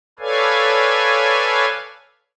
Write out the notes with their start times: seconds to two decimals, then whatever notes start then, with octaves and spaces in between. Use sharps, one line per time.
0.19 A4 B4 C#5 D5 F5 G#5